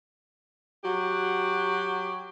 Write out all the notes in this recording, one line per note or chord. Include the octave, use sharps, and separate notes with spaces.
F#3 F#4 G4